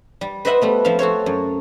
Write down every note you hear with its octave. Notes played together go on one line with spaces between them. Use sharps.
G3
B4 C5 D#5 E5 F#5 B5
G3 A3 B3
F3 C4 E5 F5
F#4 A4 C5 C#5
F#2